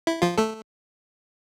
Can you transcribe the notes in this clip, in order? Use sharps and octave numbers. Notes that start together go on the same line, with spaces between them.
E4
F3 F4
A3 A4